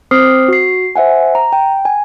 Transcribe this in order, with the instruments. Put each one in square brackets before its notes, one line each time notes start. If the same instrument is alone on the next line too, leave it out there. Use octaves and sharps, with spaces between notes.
[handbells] C4 C5 D6 D#6 F6 C7
F#4 C7
C5 E5 F#5 G#5
A#5
G5
G#5